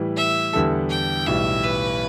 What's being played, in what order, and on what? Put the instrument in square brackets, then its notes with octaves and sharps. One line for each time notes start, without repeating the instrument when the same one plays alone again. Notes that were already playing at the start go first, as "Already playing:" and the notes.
Already playing: [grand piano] A2 E3 G3 E4
[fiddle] E5
[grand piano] E2 D3 G3 E4 A4
[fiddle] G5
[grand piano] B1 A2 E3 G3 [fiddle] E5
[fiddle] B4